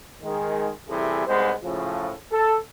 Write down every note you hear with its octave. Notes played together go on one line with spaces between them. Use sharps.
D#3 G#3
C3 E3 G3 E4 G#4 A4
C2 G#2 G#3 B3 C5
A2 C#3 F3
A4